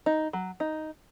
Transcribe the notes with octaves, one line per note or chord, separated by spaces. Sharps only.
D#4
F#3
D#4